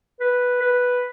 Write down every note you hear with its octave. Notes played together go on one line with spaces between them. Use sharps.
B4
B4